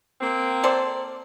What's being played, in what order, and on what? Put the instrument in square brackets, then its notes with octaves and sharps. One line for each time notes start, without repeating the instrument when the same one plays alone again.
[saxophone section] A#3 C4
[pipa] A4 C5 D5